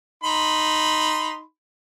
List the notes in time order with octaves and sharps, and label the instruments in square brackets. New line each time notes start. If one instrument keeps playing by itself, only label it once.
[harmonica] D#4 B5 C6